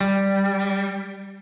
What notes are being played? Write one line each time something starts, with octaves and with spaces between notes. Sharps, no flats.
G3